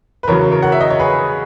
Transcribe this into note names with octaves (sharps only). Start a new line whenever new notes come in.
B4
E2 C#3 F#3 A#4 C#5
A#4 C#5
F#5
E5
D#5
C#5
G#4 B4